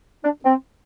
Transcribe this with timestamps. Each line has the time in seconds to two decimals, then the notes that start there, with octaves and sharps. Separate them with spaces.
0.24 D4
0.45 C4